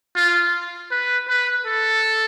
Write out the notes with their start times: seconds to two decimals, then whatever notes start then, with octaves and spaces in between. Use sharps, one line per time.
0.16 F4
0.91 B4
1.29 B4
1.66 A4